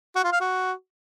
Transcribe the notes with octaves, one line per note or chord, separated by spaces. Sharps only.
F#4
F4
F5
F#4